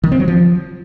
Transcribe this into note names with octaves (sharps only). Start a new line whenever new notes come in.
D#3
C4
F#3
F3